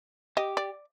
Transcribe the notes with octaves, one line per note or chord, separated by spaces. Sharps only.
G4 D#5
D5